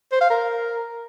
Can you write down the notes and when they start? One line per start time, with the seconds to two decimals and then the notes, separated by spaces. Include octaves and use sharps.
0.12 C5
0.21 F5
0.30 A#4